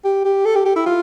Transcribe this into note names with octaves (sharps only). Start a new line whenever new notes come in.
G4
G4
A4
G4
G4
E4
F4